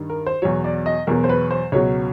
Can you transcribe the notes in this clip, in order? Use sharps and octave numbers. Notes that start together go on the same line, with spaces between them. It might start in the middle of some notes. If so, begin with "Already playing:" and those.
Already playing: G2 D#3 G3
A#4
C5
E2 B2 F#3 C#5
D5
D#5
E2 B2 F#3 A#4
C5
B4
C5
C#2 B2 F#3 C#5